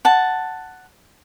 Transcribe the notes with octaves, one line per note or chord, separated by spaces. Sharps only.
F#5 A5